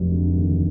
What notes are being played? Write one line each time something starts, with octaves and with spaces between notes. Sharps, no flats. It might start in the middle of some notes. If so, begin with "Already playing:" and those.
Already playing: F1 F#3
D3
D#2